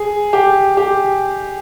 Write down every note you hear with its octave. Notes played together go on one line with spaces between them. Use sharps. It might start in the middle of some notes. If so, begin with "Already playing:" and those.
Already playing: G#4
G4
G4